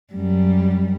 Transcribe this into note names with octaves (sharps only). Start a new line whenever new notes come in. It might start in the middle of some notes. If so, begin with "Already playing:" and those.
F#2 G3